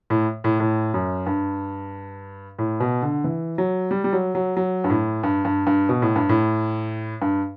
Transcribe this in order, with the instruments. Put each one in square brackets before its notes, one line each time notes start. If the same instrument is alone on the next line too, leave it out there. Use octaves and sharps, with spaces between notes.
[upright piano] A2
A2
A2
F#2
G2
A2
B2
D3
E3
F#3
G3
G3
F#3
F#3
F#3
G2
A2
G2
G2
G2
B2
A2
G2
A2
G2